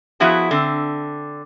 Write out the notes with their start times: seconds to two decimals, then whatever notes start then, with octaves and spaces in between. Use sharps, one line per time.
0.20 F3 B3 E4 F#4 G#4
0.51 D3 C4